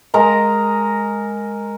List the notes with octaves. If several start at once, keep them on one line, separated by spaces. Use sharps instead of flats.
G#3 A#4 A#5